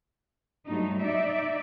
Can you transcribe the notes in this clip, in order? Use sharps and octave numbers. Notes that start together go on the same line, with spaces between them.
G2 F#3 G3 A3 D#4
D#4 D5 E5